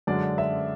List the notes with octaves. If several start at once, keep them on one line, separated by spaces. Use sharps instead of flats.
F#2 D3 G#3 D4 D5
E5